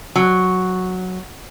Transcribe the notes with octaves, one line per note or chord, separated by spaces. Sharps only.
F#3